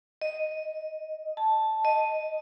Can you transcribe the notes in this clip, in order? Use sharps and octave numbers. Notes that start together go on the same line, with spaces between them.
D#5
A5
D#5